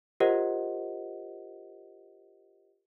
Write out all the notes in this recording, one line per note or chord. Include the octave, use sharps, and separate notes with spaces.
F4 G4 A#4 C5 D#5 F#5